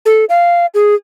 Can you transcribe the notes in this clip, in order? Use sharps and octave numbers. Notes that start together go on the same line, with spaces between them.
A4
F5
G#4